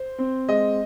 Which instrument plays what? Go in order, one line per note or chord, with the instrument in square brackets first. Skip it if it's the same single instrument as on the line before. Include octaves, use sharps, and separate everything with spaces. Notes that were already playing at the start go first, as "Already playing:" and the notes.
Already playing: [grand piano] C5
C4
G#3 D#5